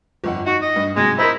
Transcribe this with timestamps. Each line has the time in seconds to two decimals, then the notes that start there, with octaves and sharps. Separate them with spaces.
0.24 G1 F2 F#5
0.46 D#4 F#4
0.62 D#5
0.76 G2
0.96 G#2 C3 F#3 G#3
1.19 D#4 E4 A#4 C5